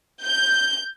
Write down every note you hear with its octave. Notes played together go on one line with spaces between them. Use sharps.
G6